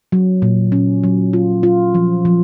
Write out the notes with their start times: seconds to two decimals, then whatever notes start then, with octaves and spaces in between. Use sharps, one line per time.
0.12 F#3
0.42 A#2
0.72 C#4
1.04 F#3
1.33 F4
1.63 F4
1.95 F3
2.25 F3